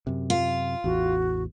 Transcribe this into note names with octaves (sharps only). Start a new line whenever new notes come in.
F#2 C3
F4
A1 E2 F#4